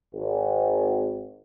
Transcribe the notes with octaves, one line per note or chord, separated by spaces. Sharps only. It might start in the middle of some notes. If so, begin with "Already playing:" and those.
G#1